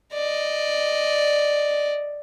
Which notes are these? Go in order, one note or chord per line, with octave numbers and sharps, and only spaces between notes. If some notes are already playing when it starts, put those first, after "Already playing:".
D5 D#5